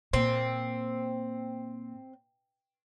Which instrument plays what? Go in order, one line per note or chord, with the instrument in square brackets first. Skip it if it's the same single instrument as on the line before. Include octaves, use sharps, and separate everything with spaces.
[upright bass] A#2 [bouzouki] C4